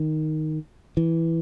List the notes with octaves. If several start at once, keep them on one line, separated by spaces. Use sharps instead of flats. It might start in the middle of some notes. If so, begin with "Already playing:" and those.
Already playing: D#3
E3